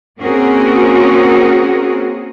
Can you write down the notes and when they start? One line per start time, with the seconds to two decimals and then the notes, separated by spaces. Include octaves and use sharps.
0.20 A#3 C4 C#4 F#4 G#4 A#4